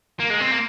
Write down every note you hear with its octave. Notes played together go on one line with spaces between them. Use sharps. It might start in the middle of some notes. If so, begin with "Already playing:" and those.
A#3
G#3
C4
A#3